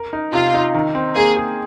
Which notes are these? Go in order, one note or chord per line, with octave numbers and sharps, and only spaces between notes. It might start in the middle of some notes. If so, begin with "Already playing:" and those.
Already playing: A#4
D#4
C3 F4
D#4
D#3
C4
A#3 G#4
G#4